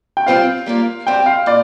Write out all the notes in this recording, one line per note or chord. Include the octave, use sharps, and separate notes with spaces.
G5
G3 C4 F4 C5 F5
G3 A#3 F4 D5
G3 C4 G4 D5 G5
F5
A#2 D5